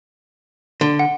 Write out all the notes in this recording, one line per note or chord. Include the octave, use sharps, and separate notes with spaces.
D3
F#5